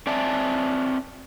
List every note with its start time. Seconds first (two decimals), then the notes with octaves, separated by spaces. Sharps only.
0.07 C4 D5 E5 G#5 A5